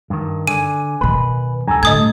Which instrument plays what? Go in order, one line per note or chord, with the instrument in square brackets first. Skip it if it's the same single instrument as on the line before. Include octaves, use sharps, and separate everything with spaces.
[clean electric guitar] G2 D#3
[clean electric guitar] D3 [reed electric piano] G#5 [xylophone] D#7
[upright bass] B2 D#3 [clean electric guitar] B4
[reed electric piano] C#2 G#5 A#5 [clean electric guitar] G2 A4
[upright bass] A2 [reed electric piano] D3 A3 [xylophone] D#5 D#6 G#6